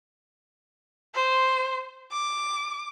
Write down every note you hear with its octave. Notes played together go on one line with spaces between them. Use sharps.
C5
D6